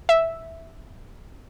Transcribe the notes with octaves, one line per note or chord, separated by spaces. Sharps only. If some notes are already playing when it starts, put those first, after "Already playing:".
E5